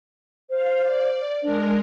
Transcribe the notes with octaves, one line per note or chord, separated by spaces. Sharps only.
C5 F5
D5
G#3 D4 A#4